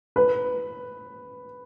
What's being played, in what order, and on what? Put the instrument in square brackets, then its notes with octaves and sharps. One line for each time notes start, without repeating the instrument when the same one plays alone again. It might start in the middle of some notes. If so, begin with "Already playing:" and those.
[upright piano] B4